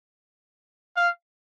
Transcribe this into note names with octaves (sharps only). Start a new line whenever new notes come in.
F5